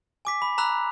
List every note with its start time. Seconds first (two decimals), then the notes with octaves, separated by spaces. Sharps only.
0.25 G#5 D6 B6
0.42 B5
0.58 A#5 B5 E6 F#6 F7